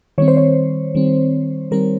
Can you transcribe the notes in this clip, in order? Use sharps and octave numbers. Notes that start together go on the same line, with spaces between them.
D#3 G3 C4 C#5
C5
C#5
D#3 G3 C4
D#3 G3 C4 A#4